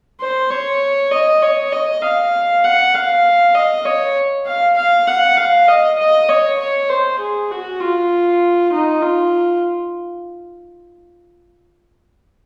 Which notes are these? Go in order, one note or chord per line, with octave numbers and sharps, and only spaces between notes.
C5
C#5
D#5
C#5
D#5
F5
F#5
F5
D#5
C#5
F5
F5
F#5
F5
D#5
D#5
C#5
C#5
C5
G#4
F#4
F4
D#4
F4